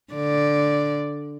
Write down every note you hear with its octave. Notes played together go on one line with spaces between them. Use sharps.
D3 D5